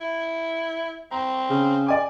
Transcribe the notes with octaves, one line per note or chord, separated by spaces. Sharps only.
E4
C4 A#5
C#3
D5 G#5 D6